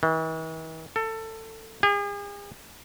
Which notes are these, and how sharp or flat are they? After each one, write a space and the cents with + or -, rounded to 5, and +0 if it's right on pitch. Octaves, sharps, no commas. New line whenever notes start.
E3 -45
A4 +20
G#4 -40